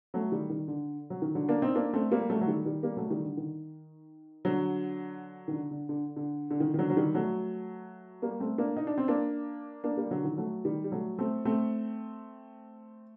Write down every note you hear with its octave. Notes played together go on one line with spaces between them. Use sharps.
F#3 A3
D#3 G3
D#3
D3
F#3
D#3
D3 F#3
A#3 D4
C4 D#4
A#3 D4
A3 C4
G3 A#3
F#3 A3
F#3
D#3 G3
D#3 G3
G3 A#3
F#3 A3
D#3 G3
D3
D#3
D3 F#3
D#3
D3
D3
D3
D3
D3
D#3
D#3
D3 F#3
F#3
D#3 G3
F#3 A3
G3 A#3
A3 C4
A#3 D4
D#4
D4
C4
A#3 D4
A#3 D4
G3 A#3
D3 F#3
D#3
F#3 A3
D#3 G3
G3
F#3 A3
A3 C4
A3 C4